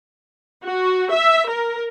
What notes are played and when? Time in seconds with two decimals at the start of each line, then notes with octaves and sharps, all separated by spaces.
0.64 F#4
1.10 E5
1.49 A#4